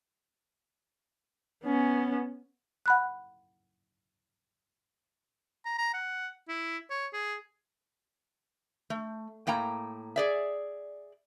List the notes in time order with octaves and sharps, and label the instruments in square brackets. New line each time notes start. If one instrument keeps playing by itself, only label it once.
[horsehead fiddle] B3 C#4
[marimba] F#5 B5 F#6
[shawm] A#5
A#5
F#5
E4
C#5
G#4
[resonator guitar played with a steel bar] A3
A2 A#3 G5 A#5
G#4 D5 E5